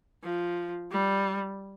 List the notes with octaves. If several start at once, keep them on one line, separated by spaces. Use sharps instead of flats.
F3
G3